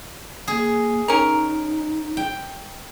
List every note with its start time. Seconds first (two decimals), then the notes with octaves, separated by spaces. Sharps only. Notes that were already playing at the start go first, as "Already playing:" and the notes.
0.48 A#3 G#4
1.08 C#4 D#4 A#4
2.17 G5